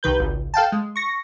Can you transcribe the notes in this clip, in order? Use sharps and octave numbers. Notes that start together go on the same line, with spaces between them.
C2 D#3 B4 G6
G#1 C#2
A4 F5 G5 A5
G#3
C#6 A#6